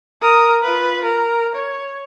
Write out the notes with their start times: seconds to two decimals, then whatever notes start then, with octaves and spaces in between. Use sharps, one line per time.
0.21 A#4 D#6
0.62 F4 B4
1.04 A#4
1.55 C#5